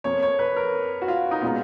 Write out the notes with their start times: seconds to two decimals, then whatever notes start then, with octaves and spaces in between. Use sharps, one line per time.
0.04 F2 F3 A#3 C#5
0.22 C#5
0.39 B4
0.56 A#4
1.02 F#4
1.08 F4
1.31 D#4
1.42 A#2 G#3 B3 F4